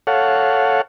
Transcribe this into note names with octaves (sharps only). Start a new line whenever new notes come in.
A4 C#5 F5 F#5